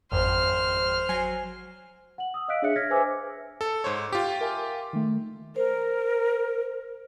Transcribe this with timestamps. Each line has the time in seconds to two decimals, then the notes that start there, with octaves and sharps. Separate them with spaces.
0.12 G#1 F2 C5 F6
1.09 F#3 G#5 C7
2.18 F#5 F#7
2.34 D#6 E6
2.48 D#5 F5 E6 F#6 B6 D7
2.62 D4 G#4 C#5 E5 F#6 C#7
2.76 C#5 F6 G#6 A#6 B6
2.90 B4 C5 E5 G#5 D6 E6
3.61 A4
3.84 G#2 C5 C#5
4.13 F4 G4
4.41 A#4 E5 G#5
4.93 D#3 A3
5.56 A#4 C5